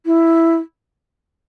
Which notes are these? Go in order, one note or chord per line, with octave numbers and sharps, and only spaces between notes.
E4